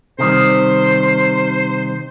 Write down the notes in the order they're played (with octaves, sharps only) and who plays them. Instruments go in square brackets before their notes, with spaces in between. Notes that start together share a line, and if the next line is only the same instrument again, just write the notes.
[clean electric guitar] C3 D#3 G3 [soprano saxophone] C5